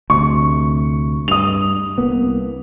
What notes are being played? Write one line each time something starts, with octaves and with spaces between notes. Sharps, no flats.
D2 C3 C#6
G2 D#6 F7
C2 A#3 B3